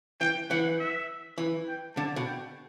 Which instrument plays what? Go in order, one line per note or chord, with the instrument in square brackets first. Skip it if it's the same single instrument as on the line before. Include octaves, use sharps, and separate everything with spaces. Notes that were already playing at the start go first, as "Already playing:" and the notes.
[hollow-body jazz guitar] E3 [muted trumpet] G5
[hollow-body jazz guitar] E3 [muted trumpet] F#5
[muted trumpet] E5
[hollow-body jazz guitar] E3
[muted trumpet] G5
[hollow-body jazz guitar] D3 [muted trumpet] A5
[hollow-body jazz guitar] B2
[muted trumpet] G5